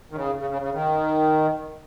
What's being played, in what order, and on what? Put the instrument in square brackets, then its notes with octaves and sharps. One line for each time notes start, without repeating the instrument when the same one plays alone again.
[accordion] D#3
C#3
C#3
C#3
C#3
D#3